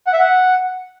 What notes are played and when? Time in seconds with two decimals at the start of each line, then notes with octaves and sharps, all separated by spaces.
0.07 F#5
0.13 E5
0.20 F#5